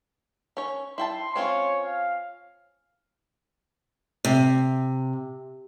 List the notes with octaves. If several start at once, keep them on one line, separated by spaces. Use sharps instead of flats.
C#4 C#5
E4 G5 A5 C6
C4 C#4 F4 C#5
F5
C3